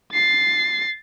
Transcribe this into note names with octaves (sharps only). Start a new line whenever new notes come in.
A6 C7